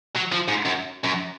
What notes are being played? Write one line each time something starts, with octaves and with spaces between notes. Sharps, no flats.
F#3
F3
G#2
F#2
F#2